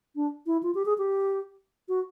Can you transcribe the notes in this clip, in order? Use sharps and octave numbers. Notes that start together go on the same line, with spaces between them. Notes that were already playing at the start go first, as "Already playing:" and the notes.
D4
E4
F4
G4
G#4
G4
F#4